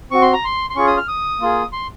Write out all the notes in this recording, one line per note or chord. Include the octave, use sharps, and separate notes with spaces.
C4 F#4 C#6
C6
A#5
C6
C6
C#4 F4 G#4 C#6
D#6
F6
D#6
A#3 F4 G#4
C6